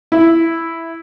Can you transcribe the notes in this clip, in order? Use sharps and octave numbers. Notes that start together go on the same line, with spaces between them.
E4